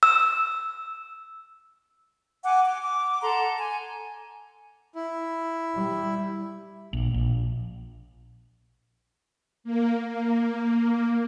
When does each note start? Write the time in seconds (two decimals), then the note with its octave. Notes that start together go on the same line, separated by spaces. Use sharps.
0.03 E6
2.45 F#5 G#5 D6
2.64 D6
2.84 D6
3.22 A4 F#5 A#5 C6
3.57 G#5
4.95 E4
5.76 G3
6.93 A#1
7.14 A#1
9.64 A#3
10.06 A#3